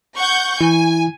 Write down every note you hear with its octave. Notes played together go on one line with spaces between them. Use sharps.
F#5 C#6 G6
E3 E4 G#5